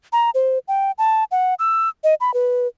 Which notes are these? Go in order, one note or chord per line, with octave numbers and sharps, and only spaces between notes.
A#5
C5
G5
A5
F#5
E6
D#5
B5
B4